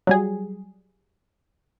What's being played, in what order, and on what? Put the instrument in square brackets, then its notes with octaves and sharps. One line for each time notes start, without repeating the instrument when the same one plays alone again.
[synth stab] F#3 G3 G#4